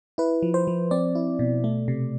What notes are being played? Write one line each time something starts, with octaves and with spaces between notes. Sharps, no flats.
E4 B4
F3
C5
F3
C4 D5
E4
B2
A3
C3